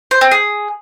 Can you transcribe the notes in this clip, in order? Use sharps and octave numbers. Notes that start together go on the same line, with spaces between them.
C5
C4
G#4